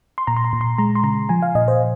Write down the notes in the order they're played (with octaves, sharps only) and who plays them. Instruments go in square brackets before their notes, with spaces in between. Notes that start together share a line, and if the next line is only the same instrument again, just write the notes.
[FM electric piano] C6
A#2 A#5
C6
A#5
A#2
C6
G#3 A#5
C6
C#3 A#5
F3 G#5
F5
A#2 D#5
C5